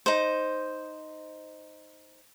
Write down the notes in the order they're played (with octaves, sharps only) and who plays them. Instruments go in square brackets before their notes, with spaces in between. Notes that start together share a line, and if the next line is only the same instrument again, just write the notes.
[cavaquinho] D#4 C5